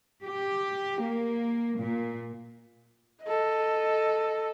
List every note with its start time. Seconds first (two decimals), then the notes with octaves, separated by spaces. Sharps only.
0.23 G4
1.00 A#3
1.79 A#2
3.23 A4 D#5